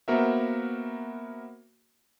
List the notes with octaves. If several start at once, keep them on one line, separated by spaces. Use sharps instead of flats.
A#3 B3 F#4 A#4 C5 E5